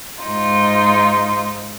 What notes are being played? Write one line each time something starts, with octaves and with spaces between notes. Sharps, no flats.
G#2 D#4 F4